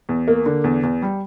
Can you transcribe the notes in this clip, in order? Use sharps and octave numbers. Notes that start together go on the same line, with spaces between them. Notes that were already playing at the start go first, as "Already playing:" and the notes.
E2
A#3
D3
E2
E2
G3